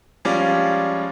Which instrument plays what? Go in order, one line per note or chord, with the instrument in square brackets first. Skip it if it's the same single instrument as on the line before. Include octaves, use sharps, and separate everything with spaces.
[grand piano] F3 G3 G#3 C#4 F4 D5